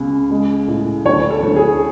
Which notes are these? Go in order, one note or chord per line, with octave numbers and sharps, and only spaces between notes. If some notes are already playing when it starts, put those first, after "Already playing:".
Already playing: C#2 C#3
G#3
A2
D2 C#5
A4
D2
G#4